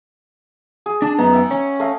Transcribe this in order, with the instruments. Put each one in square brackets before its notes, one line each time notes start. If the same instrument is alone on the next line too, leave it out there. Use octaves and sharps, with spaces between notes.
[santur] G#4
[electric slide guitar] D4 A5
[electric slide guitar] F#2 B3 [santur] D#4
[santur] E5 F#5 G5
[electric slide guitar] C#4
[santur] A3 D#5 F5